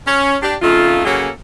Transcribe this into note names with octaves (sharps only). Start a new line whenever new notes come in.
C#4
D4 G4
F2 C#3 A3 D#4 F4
C#3 F#3 A#3 C#4 G#4 A4